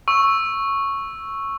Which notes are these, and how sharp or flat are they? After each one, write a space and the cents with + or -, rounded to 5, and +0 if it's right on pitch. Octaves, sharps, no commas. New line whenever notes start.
C#6 -5 E6 +0